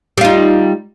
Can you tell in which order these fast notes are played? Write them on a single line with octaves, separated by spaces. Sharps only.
G3 F4 D#4